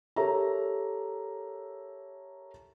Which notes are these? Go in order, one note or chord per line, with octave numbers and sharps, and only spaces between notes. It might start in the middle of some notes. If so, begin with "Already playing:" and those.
G4 A4 A#4 C#5 E5 A#5